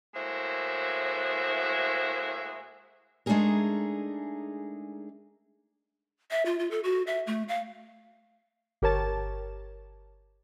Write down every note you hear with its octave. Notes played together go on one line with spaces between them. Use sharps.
A2 G#3 A#3 F#4 C5 E5
G#3 A3 D4 D#4 G#4 A#4
E5
F4
F4
A4
F#4
E5
A3
F5
G1 G4 A#4 C#5 A5 A6